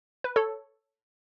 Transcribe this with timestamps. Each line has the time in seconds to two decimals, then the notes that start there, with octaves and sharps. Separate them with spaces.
0.24 B4
0.36 A4 C#5